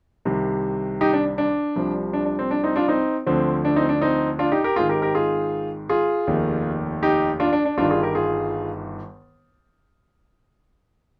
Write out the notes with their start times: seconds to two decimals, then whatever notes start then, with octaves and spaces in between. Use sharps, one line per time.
0.25 C2 C3 D#3
1.01 D#4 G4
1.13 D4
1.38 D4
1.76 C2 C3 F3
2.13 D4
2.26 D4
2.39 C4
2.51 D4
2.63 C4 D#4
2.76 D4 F4
2.88 C4 D#4
3.26 D2 D3 F3 C4
3.65 D4
3.76 C4 D#4
3.89 D4
4.01 C4 D#4
4.39 D4 F4
4.52 D#4 G4
4.64 G4 A#4
4.76 G#1 G#2 D#3 F4 G#4
4.89 G4 A#4
5.02 G4 A#4
5.15 F4 G#4
5.89 F4 G#4
6.27 F1 D#2 D#3
7.03 D#4 G4
7.40 D4 F4
7.53 D4
7.65 D4
7.78 G1 G2 D#3 D4 F4
7.90 F4 G#4
8.03 G4 A#4
8.15 F4 G#4